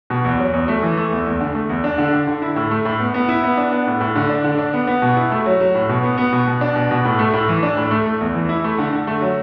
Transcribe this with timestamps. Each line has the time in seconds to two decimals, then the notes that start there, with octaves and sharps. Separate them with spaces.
0.10 B2
0.25 E2
0.39 F#3
0.53 E2
0.68 A3
0.83 E3
0.97 A3
1.12 E2
1.26 E2
1.41 D3
1.55 A3
1.69 E2
1.84 D4
1.98 D3
2.13 D3
2.27 D3
2.42 E4
2.56 A2
2.71 A3
2.85 A2
3.00 B3
3.14 B3
3.29 E4
3.44 B3
3.57 D4
3.72 B3
3.87 A2
4.00 A2
4.15 D3
4.30 D4
4.44 D3
4.58 D4
4.73 B3
4.87 B3
5.02 B2
5.17 E4
5.31 A3
5.46 F#3
5.60 F#3
5.75 A2
5.89 B2
6.03 B3
6.17 B3
6.33 B2
6.47 B2
6.61 D4
6.76 B2
6.91 B2
7.05 A2
7.19 A3
7.33 A2
7.48 E3
7.63 D4
7.77 A2
7.91 A3
8.06 A3
8.21 E2
8.35 E3
8.49 E4
8.64 A3
8.78 D3
8.93 D3
9.07 A3
9.22 F#3